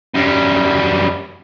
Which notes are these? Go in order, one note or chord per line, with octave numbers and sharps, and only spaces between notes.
F#2 G3